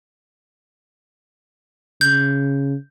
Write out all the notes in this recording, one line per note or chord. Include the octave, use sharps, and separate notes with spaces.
C#3 G6